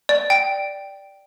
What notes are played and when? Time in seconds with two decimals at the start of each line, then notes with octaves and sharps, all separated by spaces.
0.09 D5
0.30 G5